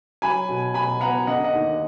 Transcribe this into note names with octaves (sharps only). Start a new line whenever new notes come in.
F#3 G#5 B5
B2
B2 G#5 B5
B3 F#5 A#5
D3 D#5 F#5
D#5 F#5
D#2